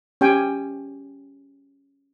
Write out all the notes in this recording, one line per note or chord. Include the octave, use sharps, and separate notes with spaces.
C#4 G4 G5 G#5